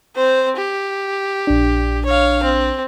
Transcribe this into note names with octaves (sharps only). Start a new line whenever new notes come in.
C4 C5
G4
A#1 D4
C#5 F5
C4